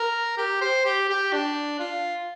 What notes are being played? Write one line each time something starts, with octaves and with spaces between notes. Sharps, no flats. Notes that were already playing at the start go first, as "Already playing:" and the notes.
Already playing: A#4
G4
C5
G4
G4
D4
F4